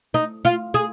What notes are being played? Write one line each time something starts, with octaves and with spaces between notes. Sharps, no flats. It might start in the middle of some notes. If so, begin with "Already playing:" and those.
D#4
F4
G#4